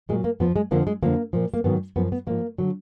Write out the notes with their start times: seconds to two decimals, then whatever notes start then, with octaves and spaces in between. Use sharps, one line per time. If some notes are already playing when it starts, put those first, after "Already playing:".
0.09 A#2 F#3 G#3
0.24 A#3
0.40 F2 F3 B3
0.56 G#3
0.71 F2 D3 F3 A#3
0.87 G#3
1.03 F2 D3 F3 A#3
1.33 A#2 F3
1.54 A#3
1.64 G#2 D#3 F#3 B3
1.96 F#2 F3 B3
2.12 B3
2.27 G#2 F3 A#3
2.58 D3 F#3